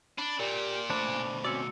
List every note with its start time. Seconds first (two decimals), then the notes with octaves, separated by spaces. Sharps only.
0.18 D4 B5
0.40 A#2 G4 A#4 D5
0.90 A3 D4 C5 B5
1.04 B2 A3
1.45 C4 C#4 F#4 D5 E6 C#7